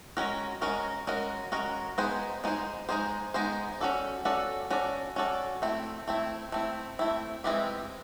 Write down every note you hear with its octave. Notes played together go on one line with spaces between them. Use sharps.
G#3 C#4 F#4 A#4
G#3 C#4 F#4 A#4
G#3 C#4 F#4 A#4
G#3 C#4 F#4 A#4
G#3 B3 D#4 G#4 C5
G#3 B3 D#4 G#4 C5
G#3 B3 D#4 G#4 C5
G#3 B3 D#4 G#4 C5
C#4 F#4 A4 D5
C#4 F#4 A4 D5
C#4 F#4 A4 D5
C#4 F#4 A4 D5
A3 C4 E4
A3 C4 E4
A3 C4 E4
A3 C4 E4
E3 G#3 C4 E4 G4